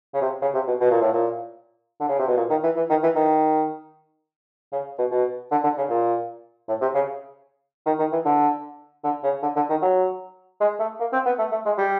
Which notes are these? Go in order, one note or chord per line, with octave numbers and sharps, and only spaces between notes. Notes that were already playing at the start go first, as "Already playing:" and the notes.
C#3
C3
C#3
C3
B2
B2
A#2
A2
A#2
D3
C#3
C3
B2
A#2
D#3
E3
E3
D#3
E3
D#3
C#3
B2
B2
D3
D3
C#3
A#2
A2
C3
C#3
D#3
D#3
E3
D3
D3
C#3
D3
D3
D#3
F#3
G#3
A3
A#3
C4
B3
A3
A3
G#3
G3